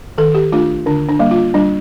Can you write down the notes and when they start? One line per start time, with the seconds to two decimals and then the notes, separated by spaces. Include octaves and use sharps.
0.18 D#3 A4
0.35 G4
0.52 A3 D4 F4
0.86 D3 D4
1.09 D4
1.19 G3 A#3
1.31 F4
1.54 G3 D4